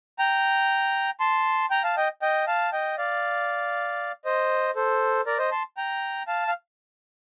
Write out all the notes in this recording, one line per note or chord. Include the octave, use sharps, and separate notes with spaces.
G5 A#5
A5 C6
G5 A#5
F5 A5
D#5 G5
D#5 G5
F5 A5
D#5 G5
D5 F5
C5 D#5
A4 C5
A#4 D5
C5 D#5
A5 C6
G5 A#5
F5 A5
F5